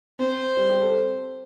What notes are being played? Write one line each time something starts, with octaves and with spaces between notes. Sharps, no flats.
C4 C5
G3
G4
A4